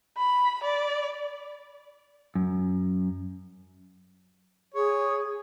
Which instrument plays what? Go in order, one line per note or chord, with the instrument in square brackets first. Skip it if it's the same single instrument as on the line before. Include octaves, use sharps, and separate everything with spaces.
[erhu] B5
D5
[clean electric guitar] F#2
[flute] G#4 [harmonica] C#5